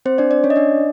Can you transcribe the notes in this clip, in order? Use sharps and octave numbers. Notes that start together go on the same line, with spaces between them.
C4 C5
D4 D5
D4 D5
C#4 C#5
D#5
D4 D5